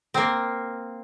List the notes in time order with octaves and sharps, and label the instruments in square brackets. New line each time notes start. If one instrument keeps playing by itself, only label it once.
[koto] A#3 C4